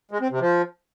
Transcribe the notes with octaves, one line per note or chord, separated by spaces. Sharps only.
G#3
C4
C3
F3